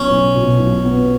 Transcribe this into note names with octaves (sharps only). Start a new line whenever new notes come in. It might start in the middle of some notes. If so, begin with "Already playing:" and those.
Already playing: B1 B2 B3 C#4
B1
B2
B1
B3